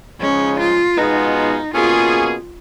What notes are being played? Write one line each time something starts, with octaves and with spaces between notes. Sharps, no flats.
C#3 F3 G#3 C#4 D#4 G#4
F4
B2 G#3 B3 D#4 F4 G#4
D#4
B2 A#3 C#4 F4 G#4